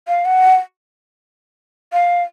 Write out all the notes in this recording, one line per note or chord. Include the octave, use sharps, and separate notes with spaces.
F5
F#5
F5